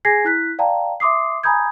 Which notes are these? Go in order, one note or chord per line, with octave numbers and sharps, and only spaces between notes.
G#4 G#5 G#6 A#6 C7
E4 F#6 B6
D5 F5 G5 A5 A#5
E5 C6 D6 D#6 C7
G#5 A#5 B5 D#6 G6 G#6